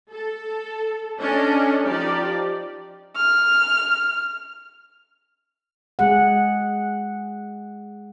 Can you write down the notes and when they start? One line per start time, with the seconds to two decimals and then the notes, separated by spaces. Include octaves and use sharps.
0.11 A4
1.19 C#4 D4 A4 D#5
1.83 F3 D#4 G4 D5
3.16 F6
5.99 G#3 G#4 F#5